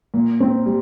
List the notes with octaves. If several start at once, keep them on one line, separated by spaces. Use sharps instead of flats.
A#2
C4
G3